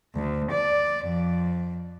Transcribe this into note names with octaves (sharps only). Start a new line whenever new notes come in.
D2
D5
F2